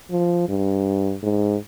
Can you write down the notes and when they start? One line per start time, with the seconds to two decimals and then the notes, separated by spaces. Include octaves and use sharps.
0.11 F3
0.48 G2
1.23 G#2